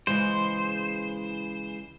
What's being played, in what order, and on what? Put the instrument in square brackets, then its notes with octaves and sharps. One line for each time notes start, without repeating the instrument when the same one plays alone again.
[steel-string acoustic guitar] C#3 E3 G#3 [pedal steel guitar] C5